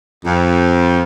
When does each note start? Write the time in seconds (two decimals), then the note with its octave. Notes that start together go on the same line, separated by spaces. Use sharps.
0.24 F2